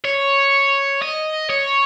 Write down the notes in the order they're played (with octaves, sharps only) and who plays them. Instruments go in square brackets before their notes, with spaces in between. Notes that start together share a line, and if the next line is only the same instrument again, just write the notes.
[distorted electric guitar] C#5
D#5
C#5